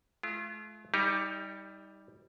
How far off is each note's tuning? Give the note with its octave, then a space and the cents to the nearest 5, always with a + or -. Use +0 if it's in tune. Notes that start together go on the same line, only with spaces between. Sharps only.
A3 -45 F4 -35
G3 +0 D#4 +30 G4 +30